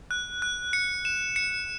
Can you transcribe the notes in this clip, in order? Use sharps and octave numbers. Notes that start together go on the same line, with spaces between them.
F#6
F#6
C#7
E7
C#7